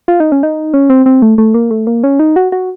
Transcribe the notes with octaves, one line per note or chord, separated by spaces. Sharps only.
F4
D#4
C#4
D#4
C#4
C4
C4
A3
A3
A#3
A3
A#3
C#4
D#4
F#4
F#4